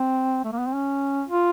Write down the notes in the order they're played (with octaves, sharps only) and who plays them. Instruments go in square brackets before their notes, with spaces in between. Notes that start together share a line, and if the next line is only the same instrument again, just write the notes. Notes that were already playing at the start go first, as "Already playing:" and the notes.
Already playing: [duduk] C4
A3
A#3
B3
C4
C#4
F4